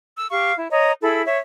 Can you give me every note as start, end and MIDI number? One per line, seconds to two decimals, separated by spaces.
0.17 0.27 88
0.31 0.53 67
0.31 0.53 77
0.31 0.53 85
0.58 0.66 64
0.71 0.92 73
0.71 0.92 75
0.71 0.92 82
1.02 1.22 64
1.02 1.22 68
1.02 1.22 69
1.02 1.22 83
1.26 1.37 73
1.26 1.37 76